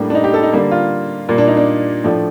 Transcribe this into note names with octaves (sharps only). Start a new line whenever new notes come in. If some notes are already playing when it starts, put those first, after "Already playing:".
Already playing: A2 G3 A#3 D4
D4
D#4
G4
A4
D#4
D3 G3 A#3
F4
A#2 G3 A#3
D4
D#4
D4
A2 F3 A3 D4